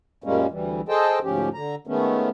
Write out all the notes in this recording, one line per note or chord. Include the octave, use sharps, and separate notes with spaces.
F#2 A#2 G3 G#3 A#3 C#4
D2 E3 G3
G#4 A4 C5 D#5 G5 A5
D2 G#2 F3 C#4 G4
D3 A#5
D#3 G#3 A3 B3 C#4